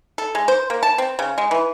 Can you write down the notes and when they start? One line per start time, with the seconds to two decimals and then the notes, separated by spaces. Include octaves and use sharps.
0.18 A4
0.35 G#3
0.48 C5
0.70 A#3
0.83 A5
0.98 C4
1.19 C#3
1.38 G#3
1.51 E3